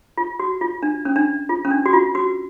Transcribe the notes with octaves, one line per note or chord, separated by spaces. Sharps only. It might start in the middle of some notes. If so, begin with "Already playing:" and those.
F4
F#4
F4
D4
C#4
D4
F4
C#4
D4
F#4
F4
F#4